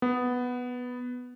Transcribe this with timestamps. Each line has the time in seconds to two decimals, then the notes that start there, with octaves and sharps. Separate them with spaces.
0.02 B3